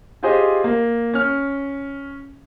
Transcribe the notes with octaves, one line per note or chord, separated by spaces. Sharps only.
F4 G4 G#4 C5 D#5
A#3
C#4 F6